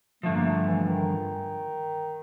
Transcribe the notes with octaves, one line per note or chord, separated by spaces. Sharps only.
G2 D3 F3 A3
A#3
A3
E3
D#3